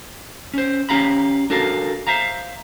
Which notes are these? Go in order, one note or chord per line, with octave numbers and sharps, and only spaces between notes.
C#4 C5
C#4 G4 F5 A#5 B5
D4 F#4 A4 A#4 F5
C5 E5 F5 A#5